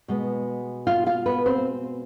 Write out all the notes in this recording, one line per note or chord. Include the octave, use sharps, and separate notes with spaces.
B2 G#3 B3
F4 F5
F4 F5
B3 B4
C4 C5